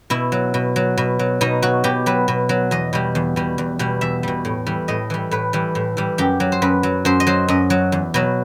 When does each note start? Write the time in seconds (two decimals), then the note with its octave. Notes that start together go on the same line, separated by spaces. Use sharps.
0.10 B2 E4
0.32 F#3
0.54 B2
0.76 F#3
0.98 B2
1.19 F#3
1.41 B2 D#4
1.62 F#3 F#4
1.84 B2 G4
2.06 F#3 B4
2.28 B2
2.49 F#3
2.71 E2 D#5
2.93 B2 G3
3.15 E2
3.36 B2 G3
3.58 E2
3.79 B2 G3
4.01 E2 E5
4.23 B2 G3
4.45 A2
4.67 E3 G3
4.88 A2 D#5
5.10 E3 G3
5.31 A2 B4
5.53 E3 G3
5.75 A2
5.97 E3 G3
6.18 F#2 G4
6.40 F#3
6.52 C5
6.62 F#2 B4
6.83 F#3
7.05 F#2 C5
7.20 D#5
7.27 F#3 C5
7.48 F#2 D#5
7.70 F#3
7.92 E2
8.14 B2 F#3